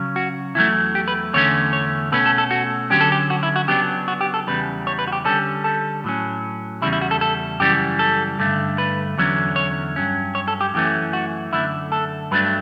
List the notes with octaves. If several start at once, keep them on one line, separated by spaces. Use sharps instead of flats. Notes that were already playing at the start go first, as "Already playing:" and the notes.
Already playing: C#3 F#3 C#4
F#4
E2 D3 F#3 A3 E4
G4
B4
E2 D3 A3 C#4 C#5
C#5
B2 A3 C#4 B4
A4
A4
F#4
D3 F#3 C#4 G4
A4
G4
F#4
E4
F#4
C#3 F#3 B3 D4 G4
F#4
G4
A4
E2 C#3 G3 B4
C#5
B4
F#4
G4
D3 G3 C#4 A4
A4
A2 F#3 C#4
E2 C#3 G3 E4
E4
F#4
A4
A4
F#2 C#3 E3 G3 G4
A4
G2 D3 A3
B4
E2 D3 F#3 C#4
C#5
G2 F#3 C#4
C#5
A4
G4
F#2 E3 A3 C#4 G4
F#4
F#2 D3 A3 E4
A4
G2 F#3 A3 D4 B4